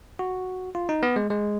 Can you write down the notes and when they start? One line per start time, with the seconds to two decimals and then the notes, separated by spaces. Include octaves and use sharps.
0.19 F#4
0.75 F4
0.89 D#4
1.03 B3
1.16 G#3
1.30 G#3